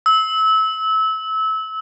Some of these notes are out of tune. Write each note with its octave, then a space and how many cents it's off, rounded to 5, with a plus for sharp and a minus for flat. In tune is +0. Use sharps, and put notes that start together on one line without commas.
E6 -25